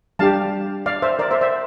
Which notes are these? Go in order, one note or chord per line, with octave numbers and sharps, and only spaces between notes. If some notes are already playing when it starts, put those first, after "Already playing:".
G3 D4 G4 F5 A5
D5 F5
C5 E5
A#4 D5
C5 E5
C5 E5